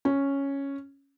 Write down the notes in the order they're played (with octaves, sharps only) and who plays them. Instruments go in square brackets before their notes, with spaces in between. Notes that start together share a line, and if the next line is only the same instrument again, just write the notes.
[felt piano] C#4